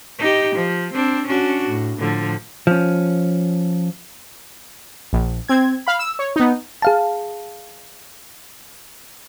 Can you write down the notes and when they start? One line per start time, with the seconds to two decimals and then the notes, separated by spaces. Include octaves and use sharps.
0.19 D#4 G4
0.56 F3
0.93 C4 D4
1.27 C#4 D4 F#4
1.68 A2
1.97 A2 D3 F3
2.67 F3 C#4
5.13 A#1
5.48 C4 G#6
5.87 F5 B5
5.99 E6
6.19 C#5
6.36 B3 D#4
6.82 G#4 F5 A5